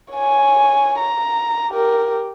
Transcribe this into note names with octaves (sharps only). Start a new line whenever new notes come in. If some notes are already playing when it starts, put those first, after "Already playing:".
C#5 G#5
A#5
G4 A#4